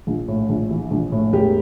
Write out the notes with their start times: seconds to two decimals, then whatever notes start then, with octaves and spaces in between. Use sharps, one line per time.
0.07 A#1
0.28 A2
0.49 A#1
0.71 E3
0.91 A#1
1.12 A2
1.33 E1 G4